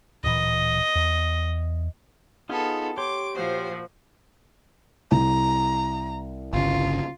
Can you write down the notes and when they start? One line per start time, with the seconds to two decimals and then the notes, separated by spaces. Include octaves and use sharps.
0.24 D1 A#2 E3 D#5
0.96 E2
2.49 B3 D#4 F4 G#4 A4
2.98 G4 C#5 C6 D6 D7
3.35 A#2 F3 F4 F#4 C5
5.11 C2 A#5
6.53 G1 C#3 F4